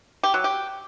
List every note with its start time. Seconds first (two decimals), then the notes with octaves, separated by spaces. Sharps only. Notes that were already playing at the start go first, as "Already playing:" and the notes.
0.23 G4
0.34 F#3
0.44 G4